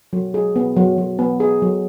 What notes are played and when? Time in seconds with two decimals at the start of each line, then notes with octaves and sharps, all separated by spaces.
0.13 F#3
0.34 G#4
0.56 B3
0.76 F#3
0.98 F#3
1.19 B3
1.40 G#4
1.62 F#3